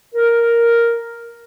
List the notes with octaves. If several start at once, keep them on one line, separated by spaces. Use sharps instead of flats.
A#4